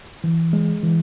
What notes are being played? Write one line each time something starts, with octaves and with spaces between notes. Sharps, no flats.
E3
G#3
E3